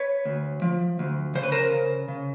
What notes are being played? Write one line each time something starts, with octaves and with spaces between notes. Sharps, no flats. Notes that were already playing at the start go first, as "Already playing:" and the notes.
Already playing: B4 C#5
D2
F3
D2
C#3 C5
B4
A#4 C5
C#3
C#3